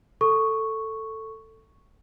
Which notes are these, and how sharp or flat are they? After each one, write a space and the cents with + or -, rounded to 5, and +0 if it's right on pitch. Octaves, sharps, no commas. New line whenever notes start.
A4 +10 C#6 +0